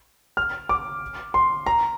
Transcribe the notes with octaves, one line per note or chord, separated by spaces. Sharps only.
F6
D6
C6
A#5